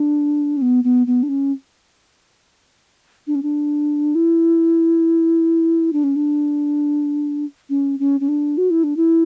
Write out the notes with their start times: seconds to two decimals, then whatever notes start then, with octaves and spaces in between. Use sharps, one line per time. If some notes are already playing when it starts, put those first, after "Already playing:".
Already playing: D4
0.57 C#4
0.62 B3
0.84 B3
1.07 B3
1.23 D4
1.29 C#4
3.27 D4
3.35 C#4
3.43 D4
4.15 E4
5.93 D4
6.04 C#4
6.16 D4
7.70 C#4
7.99 C#4
8.20 C#4
8.28 D4
8.58 F#4
8.70 E4
8.84 D4
8.97 E4